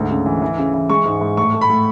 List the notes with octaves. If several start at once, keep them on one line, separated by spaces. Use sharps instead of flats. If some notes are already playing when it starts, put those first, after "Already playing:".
Already playing: D2 G#2
C#3
E3
E3
C#3
E3
G#3 C#6
G#2
G#2
A2 C#6
A3
B5
A2